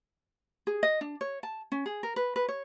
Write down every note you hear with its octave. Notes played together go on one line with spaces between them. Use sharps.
G#4
D#5
D4
C#5
A5
C#4
G#4
A#4
B4
B4
C#5